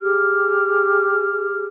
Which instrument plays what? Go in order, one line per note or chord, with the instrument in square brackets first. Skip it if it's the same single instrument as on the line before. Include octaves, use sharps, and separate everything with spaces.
[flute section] G4 G#4 F6